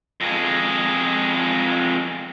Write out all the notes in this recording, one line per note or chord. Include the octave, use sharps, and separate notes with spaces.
F2 G#3